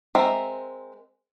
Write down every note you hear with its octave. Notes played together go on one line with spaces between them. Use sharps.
G#3 C4 A#4 E5